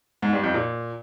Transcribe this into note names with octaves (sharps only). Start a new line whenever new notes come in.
G#2
G2
F2
A#2